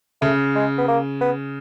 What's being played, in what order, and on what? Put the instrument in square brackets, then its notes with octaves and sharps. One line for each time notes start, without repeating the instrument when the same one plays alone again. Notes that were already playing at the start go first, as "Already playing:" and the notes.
[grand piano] C#3 [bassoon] A3
[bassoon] G#3
B3
A#3
B3